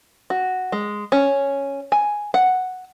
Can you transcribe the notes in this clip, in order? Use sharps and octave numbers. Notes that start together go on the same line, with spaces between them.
F#4
G#3
C#4
G#5
F#5